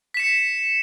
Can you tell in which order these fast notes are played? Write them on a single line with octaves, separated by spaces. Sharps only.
B6 E7 C#7